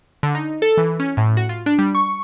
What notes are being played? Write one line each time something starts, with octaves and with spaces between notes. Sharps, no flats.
D3
D#4
A4
E3
C#4
A2
F#4
F4
D4
G3
C#6